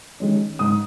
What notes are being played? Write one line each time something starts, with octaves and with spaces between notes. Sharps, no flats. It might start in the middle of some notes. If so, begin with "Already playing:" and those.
D#3 G#3 C#4
G#2 D#6